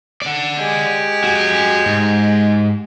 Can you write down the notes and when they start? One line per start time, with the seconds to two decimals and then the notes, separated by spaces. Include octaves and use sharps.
0.22 D5 F#5
0.57 G#3 G4
1.24 F#4 G#5
1.86 G#2